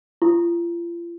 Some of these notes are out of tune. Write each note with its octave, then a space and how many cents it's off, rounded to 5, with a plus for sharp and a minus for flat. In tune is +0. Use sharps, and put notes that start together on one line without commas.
F4 -35